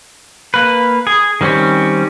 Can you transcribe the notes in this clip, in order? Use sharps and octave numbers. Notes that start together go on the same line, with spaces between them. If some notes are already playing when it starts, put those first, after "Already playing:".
A#3 B4
G#4
D#3 G3 C4 C#4